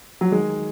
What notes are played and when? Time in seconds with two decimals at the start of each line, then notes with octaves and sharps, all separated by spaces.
0.21 F#3
0.31 D#3 G#3